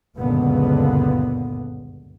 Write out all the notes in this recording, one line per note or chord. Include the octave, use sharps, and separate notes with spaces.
F#1 C#2 G2 A#2 D3 B3